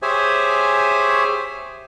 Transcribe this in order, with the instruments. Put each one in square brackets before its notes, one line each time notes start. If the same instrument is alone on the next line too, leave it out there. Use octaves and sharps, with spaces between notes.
[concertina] G4 G#4 C5 C#5 E5 G#5